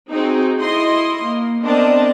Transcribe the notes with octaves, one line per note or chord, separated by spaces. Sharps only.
C4 D#4 F#4 G#4
E4 D#5 C6
A#3
B3 C4 D4 A#4 D#5 A5